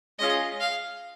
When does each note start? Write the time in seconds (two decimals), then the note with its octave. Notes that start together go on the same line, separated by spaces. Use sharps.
0.19 G#3 C#4 F4 G#4 D#5
0.60 F5